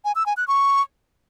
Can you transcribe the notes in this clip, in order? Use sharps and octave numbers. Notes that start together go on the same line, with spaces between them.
G#5
E6
G#5
F#6
C#6